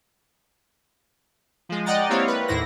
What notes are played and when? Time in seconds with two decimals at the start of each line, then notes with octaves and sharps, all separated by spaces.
1.69 F3 G#3
1.86 D5 D#5 F#5 G5 A#5 A6
2.10 A#3 C4 E4 G4 C#5 F5
2.28 B4
2.48 D#2 A2 E4 C5 A#6